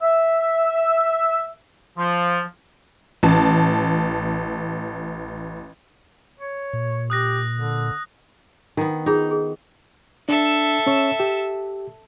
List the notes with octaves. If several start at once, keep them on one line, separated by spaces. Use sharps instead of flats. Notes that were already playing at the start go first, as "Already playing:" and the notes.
E5
F3
A1 A5
C#5
A#2
G4 D#6 F#6 A#6
D3
D#3 B3 D#4
D#4 F4 G#4 B5
G#4 A4
D4 A4 E5
C#4 C#5
G4